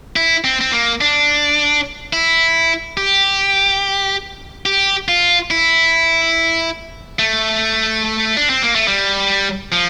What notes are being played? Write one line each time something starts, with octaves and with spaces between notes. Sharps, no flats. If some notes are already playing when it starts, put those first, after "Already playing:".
E4
C4
C4
A#3
D4
E4
G4
G4
F4
E4
A3
D4
C4
A#3
A3
G3
F3